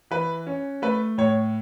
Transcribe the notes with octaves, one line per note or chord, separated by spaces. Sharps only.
E3 B4
C#4
A3 B4
A2 C#5